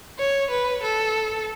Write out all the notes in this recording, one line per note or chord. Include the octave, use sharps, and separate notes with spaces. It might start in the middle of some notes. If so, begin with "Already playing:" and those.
C#5
B4
A4